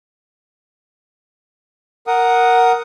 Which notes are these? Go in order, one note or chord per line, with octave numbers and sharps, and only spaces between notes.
A#4 F#5 D#6